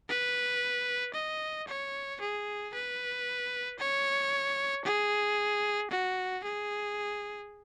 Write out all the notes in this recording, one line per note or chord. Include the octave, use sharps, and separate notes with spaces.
B4
D#5
C#5
G#4
B4
C#5
G#4
F#4
G#4